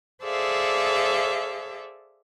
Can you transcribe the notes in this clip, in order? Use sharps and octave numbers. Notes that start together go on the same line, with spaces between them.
G#4 A4 C5 D5 E5 F5